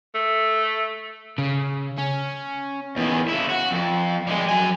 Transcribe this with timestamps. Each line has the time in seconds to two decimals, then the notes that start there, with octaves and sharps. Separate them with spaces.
0.15 A3
1.38 C#3
1.98 C#4
2.97 E2 D#3
3.28 C#3 E4
3.49 F#4
3.71 F2
4.27 G3 G#3
4.49 F#3 G#5